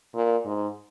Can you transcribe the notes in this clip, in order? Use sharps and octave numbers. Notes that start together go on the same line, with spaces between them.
A#2
G#2